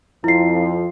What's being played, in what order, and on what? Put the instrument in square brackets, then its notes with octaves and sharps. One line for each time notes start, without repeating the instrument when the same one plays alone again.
[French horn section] F2 F3 [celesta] E4 C7